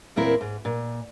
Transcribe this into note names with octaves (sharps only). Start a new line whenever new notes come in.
E2 A#2 C4 E4 A#4
G#2
A#2